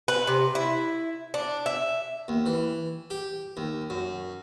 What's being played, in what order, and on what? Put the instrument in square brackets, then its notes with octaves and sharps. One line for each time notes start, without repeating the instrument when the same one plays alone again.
[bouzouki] B4
C3
E4
D4
E5
[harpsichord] D#2
E3
G4
D#2
F#2